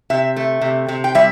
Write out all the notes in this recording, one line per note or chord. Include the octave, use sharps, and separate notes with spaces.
C3 E5
A3
C3
C3
G5
G3 E5